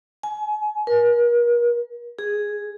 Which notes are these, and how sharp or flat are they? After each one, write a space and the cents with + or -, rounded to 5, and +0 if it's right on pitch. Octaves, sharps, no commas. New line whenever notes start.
G#5 +25
A#4 +40
G#4 +0